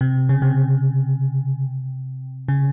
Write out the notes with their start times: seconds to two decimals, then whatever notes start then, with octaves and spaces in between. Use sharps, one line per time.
0.01 C3
0.29 C#3
0.42 C3
2.48 C#3